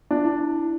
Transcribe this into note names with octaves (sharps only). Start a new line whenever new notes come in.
D4
E4